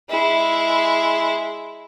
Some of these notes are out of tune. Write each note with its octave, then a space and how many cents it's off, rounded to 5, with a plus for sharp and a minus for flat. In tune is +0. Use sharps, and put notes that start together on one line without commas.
G#3 +0 E4 +0